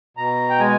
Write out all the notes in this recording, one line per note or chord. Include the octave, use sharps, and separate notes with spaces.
B2 A#5
G5
G#3 G#5